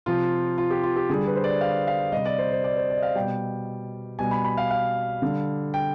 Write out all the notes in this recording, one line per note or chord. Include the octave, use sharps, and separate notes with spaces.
C3 F3 F4
F4
G4
F4
G4
D3 G3 G#4
B4
C5
D5
F5
F5
C3 G3 D#5
D5
C5
C5
D5
C5
D5
D#5
F5
B2 G3 G5
B2 G3 G#5
B5
B5
F5
F5
D3 G3
G5